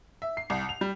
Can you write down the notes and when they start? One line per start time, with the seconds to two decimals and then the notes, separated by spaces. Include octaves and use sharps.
0.22 E5
0.37 C7
0.50 C2
0.69 F7
0.81 G3